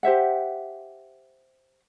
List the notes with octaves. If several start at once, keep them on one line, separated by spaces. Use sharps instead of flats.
G4 C5 E5 F#5